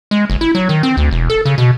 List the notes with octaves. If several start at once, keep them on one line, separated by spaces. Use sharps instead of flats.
G#3
F#1
E4
F#3
D#3
C4
D2
E1
A4
C#3
B2